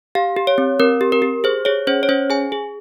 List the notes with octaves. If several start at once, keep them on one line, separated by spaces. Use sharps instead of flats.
G4 F5
G4
C#5
C4
C4 A#4
G4
A#4
G4
G#4 C5
G#4 C#5
C#4 C5
C#5
C#4 C5
G#4 G#5
G#4